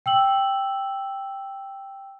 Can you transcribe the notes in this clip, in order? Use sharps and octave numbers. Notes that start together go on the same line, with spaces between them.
G5 E6 F#7